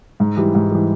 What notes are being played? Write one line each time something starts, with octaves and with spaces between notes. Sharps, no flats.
G#2
E3 G3
G#2
E3 G3